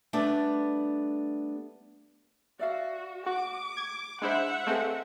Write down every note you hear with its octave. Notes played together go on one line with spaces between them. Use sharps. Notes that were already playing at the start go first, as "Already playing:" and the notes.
G3 A3 B3 D4
F#4 D5 E5 F5
F#4 D6
G#6
G#3 D4 E4 C5 E5 F#5
G#3 A3 C4 A4 B4 F5